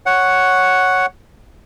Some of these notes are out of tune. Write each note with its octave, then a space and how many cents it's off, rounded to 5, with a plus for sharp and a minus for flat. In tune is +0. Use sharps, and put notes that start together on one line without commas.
C#5 +0 F#5 +0